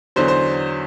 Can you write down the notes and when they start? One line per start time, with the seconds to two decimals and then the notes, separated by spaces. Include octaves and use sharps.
0.16 E2 D3 F#3 C5
0.28 C5